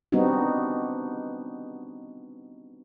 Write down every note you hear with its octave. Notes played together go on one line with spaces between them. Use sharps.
G3 B3 C4 D4 D#4 F#4